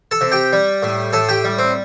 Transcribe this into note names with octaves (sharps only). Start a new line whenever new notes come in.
A4 A5
C3
G4 G5
G3
A2
A2 A4 A5
G4 G5
G3
C4